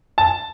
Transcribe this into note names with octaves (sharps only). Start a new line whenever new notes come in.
A5